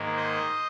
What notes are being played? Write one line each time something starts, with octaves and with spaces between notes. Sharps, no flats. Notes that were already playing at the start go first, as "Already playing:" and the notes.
Already playing: G#2 D#3 A#3
C5 D#5